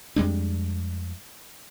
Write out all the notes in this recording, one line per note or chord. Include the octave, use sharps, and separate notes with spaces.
F2 G3 G#3 D4